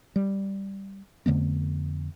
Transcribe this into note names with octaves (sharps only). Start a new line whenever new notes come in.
G3
F2 D3 A3 B3